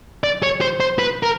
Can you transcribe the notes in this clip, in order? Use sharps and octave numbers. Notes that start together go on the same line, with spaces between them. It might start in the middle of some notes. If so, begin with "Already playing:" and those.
D5
C#5
C5
C5
B4
A#4